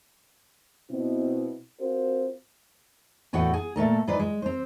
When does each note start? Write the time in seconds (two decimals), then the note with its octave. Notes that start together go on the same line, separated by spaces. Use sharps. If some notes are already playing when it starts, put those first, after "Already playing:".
0.90 B2 C4 E4
1.80 C4 F4 F#4 A#4 C5
3.33 E2 A2 F#4 A4 F#5 G5
3.54 G#4
3.76 A#2 A3 A4 A#4
4.07 G#2 F4 B4 D5
4.19 G#3
4.42 C4 C5